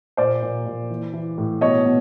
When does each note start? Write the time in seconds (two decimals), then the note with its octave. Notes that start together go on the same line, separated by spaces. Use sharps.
0.17 A#2 C5 D5
0.42 A#2
0.66 A#2
0.90 E3
1.13 E3
1.38 A2
1.61 B2 C#5 D#5
1.85 B2